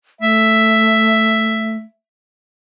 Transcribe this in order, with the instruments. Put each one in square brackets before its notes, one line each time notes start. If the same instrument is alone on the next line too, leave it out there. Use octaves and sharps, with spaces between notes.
[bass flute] A3 [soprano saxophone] E5